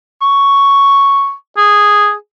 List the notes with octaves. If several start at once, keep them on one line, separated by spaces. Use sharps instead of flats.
C#6
G#4